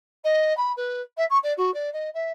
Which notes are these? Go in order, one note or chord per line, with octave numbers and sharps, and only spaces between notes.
D#5
B5
B4
E5
C#6
D5
F#4
D5
D#5
E5